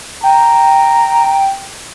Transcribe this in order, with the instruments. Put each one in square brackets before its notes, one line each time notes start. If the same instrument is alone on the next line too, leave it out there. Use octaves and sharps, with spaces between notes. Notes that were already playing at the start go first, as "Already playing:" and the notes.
[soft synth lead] G5 [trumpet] A#5